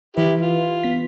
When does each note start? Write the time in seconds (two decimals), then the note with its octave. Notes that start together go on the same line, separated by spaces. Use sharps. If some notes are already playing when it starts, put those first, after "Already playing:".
0.17 E3 E4 G4 B4
0.40 F4
0.83 B3 B6